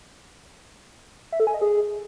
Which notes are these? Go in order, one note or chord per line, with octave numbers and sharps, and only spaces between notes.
E5
A4
G#5
D#5
G#4